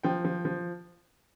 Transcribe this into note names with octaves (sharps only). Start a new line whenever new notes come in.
F3 G5
F3
F3